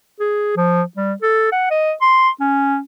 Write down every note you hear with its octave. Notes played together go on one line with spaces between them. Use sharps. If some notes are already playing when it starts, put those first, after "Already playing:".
G#4
F3
G3
A4
F#5
D#5
C6
C#4